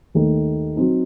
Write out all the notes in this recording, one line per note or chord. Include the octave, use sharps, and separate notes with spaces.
D#2 D#3 A3
F#3 C4 D#4